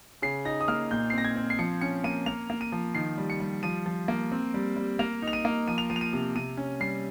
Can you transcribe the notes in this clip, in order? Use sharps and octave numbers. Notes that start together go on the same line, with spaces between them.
C#3 C7
D#4 A#6
D#6
A#3 F6
A#2 G6
C7
C4 A#6
G#6
C4
C7
F3 C#7
C#4 C#7
A#3 D#7
A#3 F7
A#3
D#7
F3
D#3 C7
G3
C#7
G3
F3 D#7
F3
A#3
C4
G3
G3
A#3 F7
D#4
F7
D#7
A#3
F3 D#7
F7
F3 D#7
F7
D#7
C3
C3 D#7
C#4
G3 C7